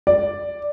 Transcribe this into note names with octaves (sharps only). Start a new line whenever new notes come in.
D5